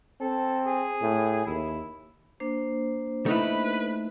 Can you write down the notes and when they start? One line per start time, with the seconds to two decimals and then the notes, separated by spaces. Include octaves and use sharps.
0.21 C4 A4
0.66 G#4
1.01 A2
1.46 D#2 E4
2.40 A#3 D4 C5
3.26 A3 D#4 E4 B4